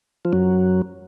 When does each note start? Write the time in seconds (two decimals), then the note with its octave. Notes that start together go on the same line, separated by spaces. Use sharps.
0.25 F3
0.33 F#2 F#3